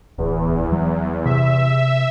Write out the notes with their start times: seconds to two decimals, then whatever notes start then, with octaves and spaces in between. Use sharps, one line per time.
0.18 D1 E2
0.72 F#3
1.25 C3 E5